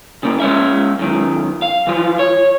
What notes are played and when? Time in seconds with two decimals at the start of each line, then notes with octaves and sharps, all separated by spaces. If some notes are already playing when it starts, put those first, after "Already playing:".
0.23 C#3 A#3
0.40 G#3 C#4 E5
0.99 F#2 D#3
1.62 F5
1.87 E3 F3
2.19 C#5